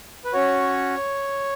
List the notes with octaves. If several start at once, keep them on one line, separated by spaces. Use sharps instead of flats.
B4
C#4 F#4 C#5